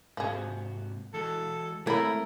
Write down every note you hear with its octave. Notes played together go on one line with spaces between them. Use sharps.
G#2 C3 F3 F#4 G#4
E3 G#3 F#4 A4
G#3 A3 C4 E4 A#4 C#5 B5